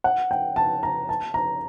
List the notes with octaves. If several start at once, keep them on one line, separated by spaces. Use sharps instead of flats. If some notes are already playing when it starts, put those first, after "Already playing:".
F#5
G5
A5
A#5
A5
A#5